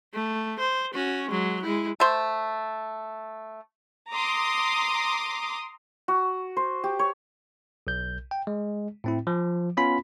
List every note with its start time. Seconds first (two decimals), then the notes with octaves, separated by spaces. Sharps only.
0.14 A3
0.60 C5
0.94 C#4 F#4
1.30 F#3 G#3
1.63 G#3 E4
2.00 A3 C5
4.11 A#5 C6 D6 D#6
6.08 F#4
6.57 C5
6.84 G4
6.99 C#5
7.87 B1 G6
8.31 G5
8.47 G#3
9.04 A2 C4 E4
9.27 F3
9.77 B3 C#4 F4 B5 B6